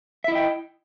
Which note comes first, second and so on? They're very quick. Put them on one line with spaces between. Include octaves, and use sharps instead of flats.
E5 E4 D#5 G5